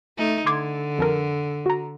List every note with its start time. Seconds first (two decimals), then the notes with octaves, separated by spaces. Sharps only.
0.18 A3 D#4
0.46 D3 C6 D6 G#6
0.98 F2 A4 A#4
1.66 F#4 A#5